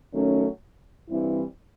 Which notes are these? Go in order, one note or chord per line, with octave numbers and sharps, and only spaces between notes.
D#3 F#3 A3 C#4
G2 E3 G3 C4 E4